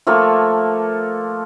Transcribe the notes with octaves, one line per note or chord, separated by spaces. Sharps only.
F3 A3 A#3 A#5